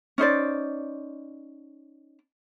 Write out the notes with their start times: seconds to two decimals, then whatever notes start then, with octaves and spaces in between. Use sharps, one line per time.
0.18 C#4 D#4 C5 D5